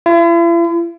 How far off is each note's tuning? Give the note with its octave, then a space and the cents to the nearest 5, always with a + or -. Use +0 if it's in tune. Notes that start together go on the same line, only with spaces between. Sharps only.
E4 +45